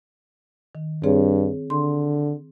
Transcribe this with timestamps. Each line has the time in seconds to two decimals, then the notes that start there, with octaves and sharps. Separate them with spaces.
0.75 D#3
1.04 G2 C4 G#4 C#5
1.70 D3 C6